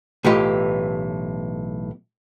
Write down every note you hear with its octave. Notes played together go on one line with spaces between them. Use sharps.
B1 A2 E3 F4 G4 D#5